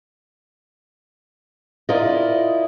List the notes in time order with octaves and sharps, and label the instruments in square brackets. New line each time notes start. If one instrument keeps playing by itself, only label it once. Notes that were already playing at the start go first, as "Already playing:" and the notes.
[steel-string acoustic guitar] E4 F4 A#4 D5 D#5